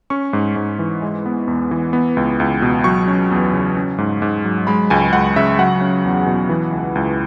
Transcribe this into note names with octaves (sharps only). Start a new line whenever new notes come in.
C#4 C#6
G#2
G#2
E3
G#3
B3
E2
E3
B3
C#2
C#2
B2
F#3 C#6
C#4
E2
C#3
C#4
G#2
G#2
F#3
G#3 B5
C#2 G#5
C#2 F#5
C#3 E5
F#3 F#5
C#4
E2
B2
E3
C#2
C#2